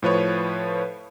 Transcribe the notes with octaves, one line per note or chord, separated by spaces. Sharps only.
A2 F3 B4 C#5